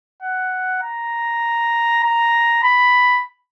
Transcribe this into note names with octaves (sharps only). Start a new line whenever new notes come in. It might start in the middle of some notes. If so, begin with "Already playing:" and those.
F#5
A#5
A#5
B5